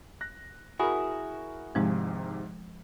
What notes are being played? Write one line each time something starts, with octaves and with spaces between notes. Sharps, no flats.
F#6 A#6
E4 F#4 G#4 A#4 B5
G#1 G#2 C3 F3 G#3